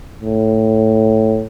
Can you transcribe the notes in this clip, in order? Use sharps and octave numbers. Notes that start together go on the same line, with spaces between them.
A2